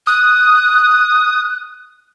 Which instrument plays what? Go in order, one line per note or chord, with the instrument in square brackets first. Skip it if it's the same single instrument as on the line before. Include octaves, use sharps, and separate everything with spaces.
[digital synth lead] D#6 [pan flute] F#6